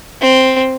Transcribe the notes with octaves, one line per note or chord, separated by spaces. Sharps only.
C4